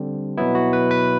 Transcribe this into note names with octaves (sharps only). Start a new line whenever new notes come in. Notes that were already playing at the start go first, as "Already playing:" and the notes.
Already playing: D3 G3 C4
B2 F#3 B3 E4
F#4
B4
B4